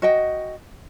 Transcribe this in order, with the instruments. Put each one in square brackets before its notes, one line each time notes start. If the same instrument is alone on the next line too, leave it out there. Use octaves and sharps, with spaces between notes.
[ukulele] F#4 D#5 G5